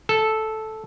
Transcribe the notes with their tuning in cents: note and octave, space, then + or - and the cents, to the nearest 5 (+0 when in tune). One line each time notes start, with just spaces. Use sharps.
A4 -10